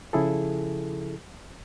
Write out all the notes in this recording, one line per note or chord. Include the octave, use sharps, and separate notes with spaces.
C#3 F3 E4 G#4 A4